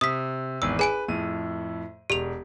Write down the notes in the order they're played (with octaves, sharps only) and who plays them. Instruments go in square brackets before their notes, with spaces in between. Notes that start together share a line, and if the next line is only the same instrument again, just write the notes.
[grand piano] C3 [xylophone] D#6 B6
[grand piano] G#1 E2 [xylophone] E6
[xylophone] G#4 G#5 D7 [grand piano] B4
[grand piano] F2 A2 D#7
[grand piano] E1 [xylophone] G4 F7